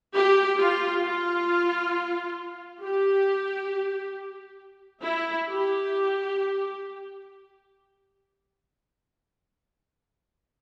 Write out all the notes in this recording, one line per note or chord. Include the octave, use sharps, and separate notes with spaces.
G4
F4
F4
G4
E4
G4